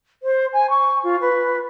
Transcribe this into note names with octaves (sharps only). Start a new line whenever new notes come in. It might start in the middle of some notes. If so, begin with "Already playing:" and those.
C5
G#5
C#6
F4
B4